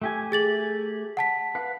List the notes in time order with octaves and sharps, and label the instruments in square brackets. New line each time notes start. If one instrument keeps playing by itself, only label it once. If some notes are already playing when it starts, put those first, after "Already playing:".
[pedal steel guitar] A3 G4 G#5
[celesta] G#4 A6 F#7
F#5 A5 B6
[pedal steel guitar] B4 F5 F#5